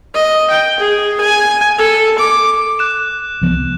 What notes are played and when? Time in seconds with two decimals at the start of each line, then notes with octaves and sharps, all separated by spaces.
0.14 D#5
0.50 G5
0.80 G#4
1.21 G#5
1.78 A4
2.18 D6
2.79 F#6 E7
3.41 C2 F3 B3